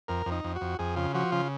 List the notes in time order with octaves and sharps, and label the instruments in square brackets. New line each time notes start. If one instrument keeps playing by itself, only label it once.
[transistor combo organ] F2 A#4
F2
D#4
F2
F#4
F2
F2 G#4
C#3 F4
F3 F#4
C#3 F4